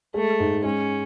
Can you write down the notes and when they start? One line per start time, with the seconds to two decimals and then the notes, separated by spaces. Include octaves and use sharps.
0.14 G#3 A3
0.40 G#2
0.64 G#3 C#4